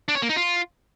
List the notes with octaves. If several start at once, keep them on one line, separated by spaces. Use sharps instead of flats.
D4
C#5
A#3
D#4
F4